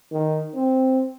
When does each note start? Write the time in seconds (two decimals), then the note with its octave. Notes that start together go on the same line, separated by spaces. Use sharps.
0.12 D#3
0.55 C4